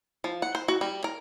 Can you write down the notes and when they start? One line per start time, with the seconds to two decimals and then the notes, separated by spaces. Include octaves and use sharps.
0.24 F3
0.42 F#5
0.55 C5
0.68 F#4
0.81 G3
1.04 A#4